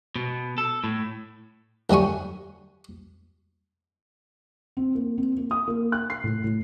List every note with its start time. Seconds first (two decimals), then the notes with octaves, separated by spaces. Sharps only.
0.16 B2
0.58 A4
0.84 A2
1.90 D2 F#3 G3 G#5 C#6
4.77 C4
4.95 A#3
5.18 C4
5.38 A#3
5.51 D#6
5.68 A#3
5.92 F#6
6.10 C7
6.24 A2
6.44 A2